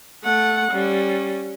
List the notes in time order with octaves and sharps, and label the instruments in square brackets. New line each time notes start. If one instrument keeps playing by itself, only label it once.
[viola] A3 F#5
G3 C#4